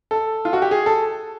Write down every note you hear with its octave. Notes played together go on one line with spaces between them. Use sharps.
A4
F4
F#4
G4
G#4
A4